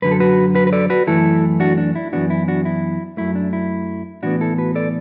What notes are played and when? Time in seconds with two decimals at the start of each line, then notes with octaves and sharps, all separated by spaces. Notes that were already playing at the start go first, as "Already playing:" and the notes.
0.02 F#2 D3 F#3 B4
0.11 A4
0.20 F#4 B4
0.55 F#4 B4
0.67 B4
0.72 A4 D5
0.90 F#4 B4
1.07 F#2 E3 A3 E4 A4
1.60 D4 F#4
1.78 D4
1.95 E4
2.13 F#2 E3 B3 D4 F#4
2.30 E4
2.48 D4 F#4
2.65 E4
3.17 F#2 F#3 A3 E4
3.35 D4
3.53 E4
4.23 A2 E3 B3 D4 F#4
4.41 E4 A4
4.58 F#4 B4
4.75 A4 D5